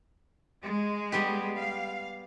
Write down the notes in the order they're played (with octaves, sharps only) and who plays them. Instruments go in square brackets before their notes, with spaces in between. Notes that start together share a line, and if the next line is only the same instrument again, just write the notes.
[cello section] G#3
[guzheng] G3 B3 G4
[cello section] F5